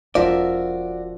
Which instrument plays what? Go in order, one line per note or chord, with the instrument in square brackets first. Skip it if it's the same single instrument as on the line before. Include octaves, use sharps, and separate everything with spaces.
[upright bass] E1 B2 [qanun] F3 A#4 E5 [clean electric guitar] F#4 D5